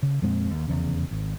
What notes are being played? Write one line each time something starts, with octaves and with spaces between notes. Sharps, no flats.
C#3
F2 A#2 G#3 C4
D#2
F1 E2 C#3
G#1